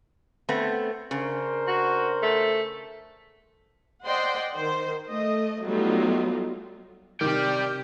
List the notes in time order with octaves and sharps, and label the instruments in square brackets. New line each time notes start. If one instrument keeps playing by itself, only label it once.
[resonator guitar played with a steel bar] A3 B3 C4
[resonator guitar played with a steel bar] C#3 [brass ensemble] D4 A#4 C5
[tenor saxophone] F#4
A3
[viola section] C5 D5 D#5 F#5 G5 C6
D#3 C5
A3 D#5
F#3 G3 A3 B3 D#4 F4
[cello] C3 G4 [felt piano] D#3 [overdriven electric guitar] D5 G5 [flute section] F6 G6